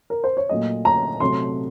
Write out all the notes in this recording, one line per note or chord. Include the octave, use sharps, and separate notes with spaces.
A#4
C5
C#5
A#2 F#3 A3 D#5
A#5
C3 F#3 A3 C6